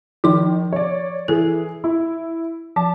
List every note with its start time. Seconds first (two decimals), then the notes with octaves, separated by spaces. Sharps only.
0.24 D#3 F3 C6
0.73 C#5 D5
1.28 E3 G#4 A4
1.84 E4
2.76 F3 A5